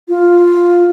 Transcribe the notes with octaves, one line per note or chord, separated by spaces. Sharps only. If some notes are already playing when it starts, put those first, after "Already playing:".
F4